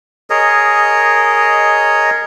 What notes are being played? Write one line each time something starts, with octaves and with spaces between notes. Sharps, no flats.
G#4 A#4 C#5 D#5